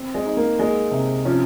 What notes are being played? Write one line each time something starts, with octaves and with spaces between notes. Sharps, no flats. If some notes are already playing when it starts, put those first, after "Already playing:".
Already playing: C4
G#3
D#4
A#3
G#3 A#3
C3
F3 C#4